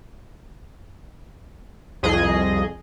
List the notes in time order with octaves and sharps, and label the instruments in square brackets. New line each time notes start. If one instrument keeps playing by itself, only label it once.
[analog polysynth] C2 F2 G#4 D#5